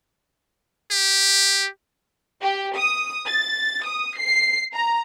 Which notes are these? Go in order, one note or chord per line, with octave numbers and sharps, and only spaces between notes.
G4
G4
D#6
A6
D#6
C7
A#5